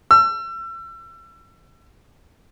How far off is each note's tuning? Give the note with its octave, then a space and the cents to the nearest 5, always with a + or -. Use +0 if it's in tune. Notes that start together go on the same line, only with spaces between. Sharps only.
E6 +35